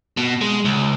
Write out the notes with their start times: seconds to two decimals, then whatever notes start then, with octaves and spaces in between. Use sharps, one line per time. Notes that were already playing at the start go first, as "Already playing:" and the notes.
0.17 B2
0.41 G#3
0.65 C#2